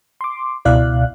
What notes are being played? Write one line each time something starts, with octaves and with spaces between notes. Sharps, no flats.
C6 D6
C#2 B2 E4 D5 F5 F#6